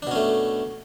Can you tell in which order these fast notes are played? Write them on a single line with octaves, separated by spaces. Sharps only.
D4 B2 C#4 A3